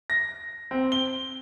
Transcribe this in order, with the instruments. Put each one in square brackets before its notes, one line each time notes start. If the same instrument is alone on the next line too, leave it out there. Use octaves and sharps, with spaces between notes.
[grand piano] A#6
C4
G7